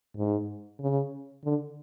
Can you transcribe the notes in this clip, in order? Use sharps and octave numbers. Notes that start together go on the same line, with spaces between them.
G#2
C#3
D3